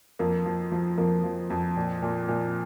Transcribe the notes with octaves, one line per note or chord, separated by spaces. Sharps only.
F2 A#3
F3
F3
F2 A#3
F3
F2
A#2
A#2
A#2